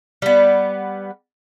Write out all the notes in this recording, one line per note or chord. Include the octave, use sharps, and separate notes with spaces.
G3 B3